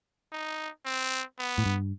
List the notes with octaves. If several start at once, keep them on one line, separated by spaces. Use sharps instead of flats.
D#4
C4
B3
A2
G2